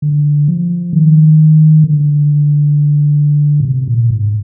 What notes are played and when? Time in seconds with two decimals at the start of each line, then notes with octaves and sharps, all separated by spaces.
0.02 D3
0.48 F3
0.93 D#3
1.84 D3
3.60 A#2
3.65 C3
3.88 A#2
4.10 G#2